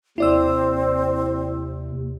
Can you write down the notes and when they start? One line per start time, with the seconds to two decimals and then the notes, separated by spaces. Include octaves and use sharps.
0.18 D#2 C3 C4 E4 D5 E6